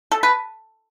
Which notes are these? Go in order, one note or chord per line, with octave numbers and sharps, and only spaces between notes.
A4
B4